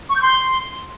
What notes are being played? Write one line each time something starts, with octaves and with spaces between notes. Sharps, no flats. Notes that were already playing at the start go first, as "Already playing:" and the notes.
C#6
G6
C6